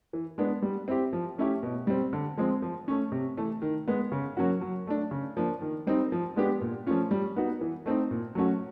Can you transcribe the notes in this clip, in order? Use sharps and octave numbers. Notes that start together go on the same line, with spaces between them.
E3
G#3 B3 D4
G3
C4 E4 G4
F3
A3 C#4 E4 G4
B2
G3 C4
D3
F3 G#3 C4
F3
A3 C#4
C3
E3 A3
D#3
G#3 B3
C#3
F#3 A#3 C#4 F#4
F#3
A3 D4
C#3
F3 A#3 D4
D#3
G3 C4 D#4
F3
G#3 B3 D4 G4
A#2
F3 A3 C#4 F4
G3
B3 D#4 F#4
E3
A3 C4 D#4
A#2
F#3 A3 C#4 F#4